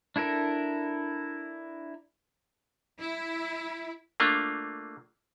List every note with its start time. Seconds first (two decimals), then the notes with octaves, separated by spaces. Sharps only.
0.16 D4 E4 A4 A#4
3.00 E4
4.20 A3 A#3 D4 F4